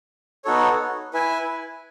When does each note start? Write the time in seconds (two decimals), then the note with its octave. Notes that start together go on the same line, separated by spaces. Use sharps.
0.45 B3 D#4 F#4 A4 C#5
1.14 E4 B4 E5 G#5